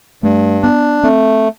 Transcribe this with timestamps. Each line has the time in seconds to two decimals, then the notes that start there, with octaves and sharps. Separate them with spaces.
0.23 G2 A3
0.63 B3 D4
1.03 A3 C4